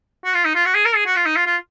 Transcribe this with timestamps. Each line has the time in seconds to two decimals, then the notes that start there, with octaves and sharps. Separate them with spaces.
0.25 F#4
0.34 F4
0.45 D#4
0.55 F4
0.66 F#4
0.75 G#4
0.86 A#4
0.95 G#4
1.06 F#4
1.16 F4
1.26 D#4
1.36 F4
1.46 F4